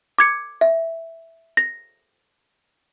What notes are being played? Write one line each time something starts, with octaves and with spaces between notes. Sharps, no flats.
D6 G#6 C#7
E5
A#6